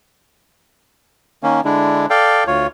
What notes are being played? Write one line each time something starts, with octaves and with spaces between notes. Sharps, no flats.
D#3 A#3 C#4
D3 G#3 D4 E4
A4 D5 F5 G5
D2 F4 C#5